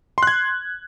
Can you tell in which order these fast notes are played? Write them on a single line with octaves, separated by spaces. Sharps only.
C6 F#6 G#6